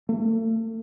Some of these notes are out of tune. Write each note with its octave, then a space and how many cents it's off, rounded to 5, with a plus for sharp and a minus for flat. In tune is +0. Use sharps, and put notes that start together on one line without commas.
A3 +35